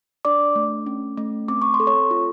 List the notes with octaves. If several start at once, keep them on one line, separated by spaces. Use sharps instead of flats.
D4 D5 D6
A3
C#4
A3
C4 D6
C#6
C6
A4
C#5 C#6
F4